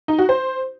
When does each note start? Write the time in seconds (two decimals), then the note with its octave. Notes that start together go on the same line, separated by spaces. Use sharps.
0.08 D#4
0.19 F#4
0.29 C5